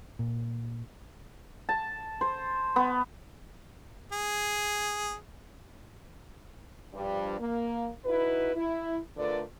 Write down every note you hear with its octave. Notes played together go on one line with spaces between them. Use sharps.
A#2
A5
C5
B3
G#4
G2 F3 G3
A#3
D#4 E4 F#4 B4
E4
D3 A3 F4 A#4 B4 D5